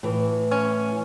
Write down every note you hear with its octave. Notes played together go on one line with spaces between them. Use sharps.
A2 E3
C#4